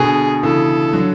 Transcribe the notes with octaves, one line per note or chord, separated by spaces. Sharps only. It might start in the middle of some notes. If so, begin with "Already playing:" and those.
Already playing: B2 D3 G#4
C#3 E3 A4
D3 F#3